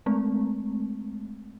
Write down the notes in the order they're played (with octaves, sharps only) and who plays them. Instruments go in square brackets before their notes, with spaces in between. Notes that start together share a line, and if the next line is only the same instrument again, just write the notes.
[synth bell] G#3 A3 C4